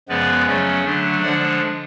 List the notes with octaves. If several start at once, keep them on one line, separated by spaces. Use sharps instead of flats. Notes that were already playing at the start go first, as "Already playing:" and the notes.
F#2 C#3 F3 G#3 B3 B4 D5
C#3 F#3 A3 C#4
D3 F#3 A3 D4
D3 F3 G#3 D4 D5 F#5